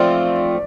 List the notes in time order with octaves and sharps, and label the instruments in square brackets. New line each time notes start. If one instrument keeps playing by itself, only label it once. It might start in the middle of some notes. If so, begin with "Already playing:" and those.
Already playing: [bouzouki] F3 A3 C4 F4 [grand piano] D5